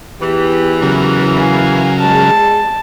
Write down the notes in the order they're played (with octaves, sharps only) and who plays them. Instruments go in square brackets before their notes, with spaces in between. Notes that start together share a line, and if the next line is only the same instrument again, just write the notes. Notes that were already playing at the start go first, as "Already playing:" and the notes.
[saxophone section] E2 E3 [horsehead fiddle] G4
[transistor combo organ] C#3 F#3 A#4
[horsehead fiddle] F5 G#5
[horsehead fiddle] G#3 G#4 [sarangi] A5